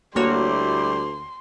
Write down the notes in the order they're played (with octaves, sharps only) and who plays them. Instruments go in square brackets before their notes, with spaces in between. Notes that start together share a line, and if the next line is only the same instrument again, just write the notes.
[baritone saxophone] D2 [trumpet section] G3 E4 D6 [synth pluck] A#3 F#4 C#5 [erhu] C6